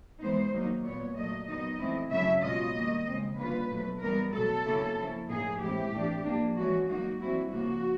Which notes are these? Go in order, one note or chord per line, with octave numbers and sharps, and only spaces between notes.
E3 G#3 B3 D#4 C5
D#3 F#3 A#3 D#4
A#2 G3 B3 C#5
A#2 F#3 A3 D#5
D#3 F#3 B3 D#4 D#5
E3 A3 C4 E4
C#3 F#3 A3 C#4 E4 E5
B2 G#3 C#4 F4 D#5
D#3 G3 A#3
C#3 F3 G#3 C4
D3 G3 A#3 C#4 F4 B4
B2 F#3 A3
E3 G3 B3 D#4 A#4
B2 F#3 A3 A4
C#3 F#3 A#3 C#4 E4
F3 A#3 C#4 E4
A2 F3 A#3 D#4 G#4
A2 E3 G#3 C4 E4 G4
A2 E3 A3 D4
F3 A#3 D4
E3 G#3 C#4 F#4
F#3 A#3 D#4 F#4
E3 G3 C4 E4 F#4
C#3 F3 A#3 F#4